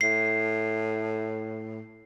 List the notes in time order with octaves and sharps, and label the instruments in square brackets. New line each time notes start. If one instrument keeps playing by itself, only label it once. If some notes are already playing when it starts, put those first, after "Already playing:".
[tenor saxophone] A2 [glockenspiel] C7